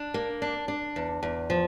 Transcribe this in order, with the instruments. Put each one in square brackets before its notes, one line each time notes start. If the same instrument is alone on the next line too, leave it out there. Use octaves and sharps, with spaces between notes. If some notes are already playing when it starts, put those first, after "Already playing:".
Already playing: [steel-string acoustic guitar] D4
A#3
D4
D4
E2
E2
F3